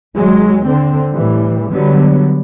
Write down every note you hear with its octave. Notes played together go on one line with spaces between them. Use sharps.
D#2 F#3 G#3
D3 C4
A2 E3 G3
D3 F#3 G3 B3